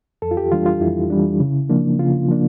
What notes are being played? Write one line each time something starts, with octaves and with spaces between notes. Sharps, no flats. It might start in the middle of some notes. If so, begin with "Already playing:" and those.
F2 A4
F4
G4
E3 G3 D4 F4
F4
F2 E4
E3 G3 D4
C#3
F3 A#3 D4
C#3 F4
F3 A#3 D4